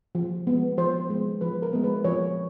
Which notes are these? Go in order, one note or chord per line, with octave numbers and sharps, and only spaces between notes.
F3
G#3 B3
F3 C5
G#3 B3
F3 B4
A#4
G#3 B3
B4
F3 C#5